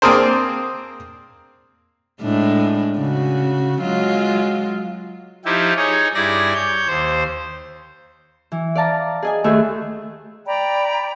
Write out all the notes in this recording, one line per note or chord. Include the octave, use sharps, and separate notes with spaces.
A#3 C4 D4 G#4 A#4 C5
A2 G#3 D4
C#3 F#4
F#3 G#3 F4
F3 D#4 E4 G4
D#4 G#4 C#5
G2 E4 G#4 D5 A#6
C#5 G6
D#2 C5
E3
D5 F5 A5 A#5
G#4 D#5 G#5
D#2 A3 G#4 E5
D5 G5 A#5 B5